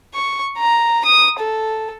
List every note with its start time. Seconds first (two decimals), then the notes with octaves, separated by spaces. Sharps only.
0.14 C#6
0.58 A#5
1.04 D#6
1.39 A4